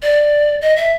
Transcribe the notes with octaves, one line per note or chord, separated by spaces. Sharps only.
D5
D#5
E5